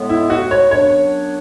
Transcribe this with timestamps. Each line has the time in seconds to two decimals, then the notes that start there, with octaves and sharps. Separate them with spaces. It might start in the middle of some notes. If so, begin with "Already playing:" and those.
Already playing: A2 G#3 B3
0.09 E4
0.30 F#4
0.51 C#5
0.71 F#2 C#3 F#3 B3 D4 C#5